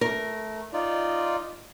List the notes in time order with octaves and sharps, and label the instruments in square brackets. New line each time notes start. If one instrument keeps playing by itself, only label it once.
[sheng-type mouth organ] A3 [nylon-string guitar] A#4
[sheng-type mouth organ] D#4 F4 D5